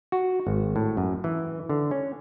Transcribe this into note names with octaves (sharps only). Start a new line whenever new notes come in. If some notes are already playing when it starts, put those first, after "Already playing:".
F#4
G#1
A2
F#2
E3
D3
C#4